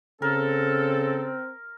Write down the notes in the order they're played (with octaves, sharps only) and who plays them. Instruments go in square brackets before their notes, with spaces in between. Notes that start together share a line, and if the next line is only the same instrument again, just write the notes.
[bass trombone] C#3 [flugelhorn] C4 [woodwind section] A4 [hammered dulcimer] A#4